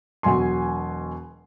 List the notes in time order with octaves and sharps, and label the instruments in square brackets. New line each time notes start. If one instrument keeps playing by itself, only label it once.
[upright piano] E1 B2 F#3 G#5 C6